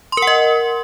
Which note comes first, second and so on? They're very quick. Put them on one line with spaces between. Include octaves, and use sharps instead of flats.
C6 A#4 F#5 D#5